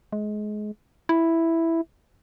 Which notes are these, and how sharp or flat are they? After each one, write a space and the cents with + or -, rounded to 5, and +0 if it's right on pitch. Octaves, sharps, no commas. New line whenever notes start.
G#3 +25
E4 +0